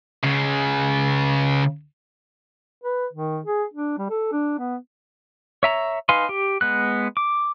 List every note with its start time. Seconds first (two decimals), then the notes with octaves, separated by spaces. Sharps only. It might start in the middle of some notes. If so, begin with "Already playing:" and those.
0.23 C#2 C#3
2.83 B4
3.13 D#3
3.45 G#4
3.74 D4
3.98 G3
4.10 A4
4.32 D4
4.59 B3
5.63 C#5 E5 A#5
6.09 D#4 B4 F5 G#5 C6
6.29 G4
6.61 G#3 B3 F#6
7.17 D6